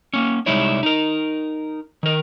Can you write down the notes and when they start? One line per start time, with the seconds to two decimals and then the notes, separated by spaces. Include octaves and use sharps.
0.14 A#3 C#4
0.46 C2 G3 G#3 D#4 E4 C#5
0.83 D#4 A#4
2.03 D#3 A#4